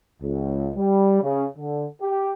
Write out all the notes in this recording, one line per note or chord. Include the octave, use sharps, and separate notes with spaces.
C#2
G3
C#3
D3
G4